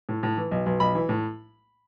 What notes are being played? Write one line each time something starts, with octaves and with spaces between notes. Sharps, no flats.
A2
A2
E3
B1
B1
B1 B5
E3
A2